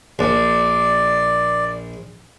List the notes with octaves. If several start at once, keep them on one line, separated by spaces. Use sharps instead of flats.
A#1 D5